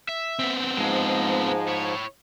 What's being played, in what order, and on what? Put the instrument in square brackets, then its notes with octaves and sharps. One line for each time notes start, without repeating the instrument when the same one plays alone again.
[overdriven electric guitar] E5
[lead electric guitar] B3 C4
[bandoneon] G#2 F3 [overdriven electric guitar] G#3
[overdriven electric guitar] E4 C#5